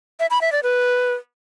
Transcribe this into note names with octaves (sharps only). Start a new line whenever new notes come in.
E5
B5
E5
D5
B4